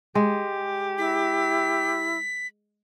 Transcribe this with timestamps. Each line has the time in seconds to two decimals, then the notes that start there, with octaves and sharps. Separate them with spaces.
0.15 G#3 G4
0.98 E4 B6